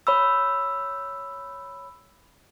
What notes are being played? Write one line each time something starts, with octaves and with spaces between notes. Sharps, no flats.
C#5 B5 E6